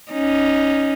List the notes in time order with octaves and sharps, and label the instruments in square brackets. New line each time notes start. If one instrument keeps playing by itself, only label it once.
[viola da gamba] C#4 D#4